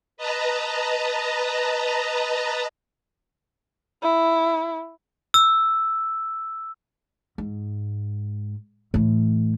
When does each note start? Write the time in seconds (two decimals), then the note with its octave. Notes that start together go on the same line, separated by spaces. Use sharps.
0.17 B4 D#5 A5 A#5
4.02 E4
5.34 E6
7.38 G#2
8.94 A2 E3